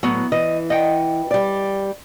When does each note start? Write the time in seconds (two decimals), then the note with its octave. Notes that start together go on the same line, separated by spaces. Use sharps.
0.03 A2 F#3 B3
0.32 E3 D#5
0.70 D#5 F#5 G5
1.31 G3 D5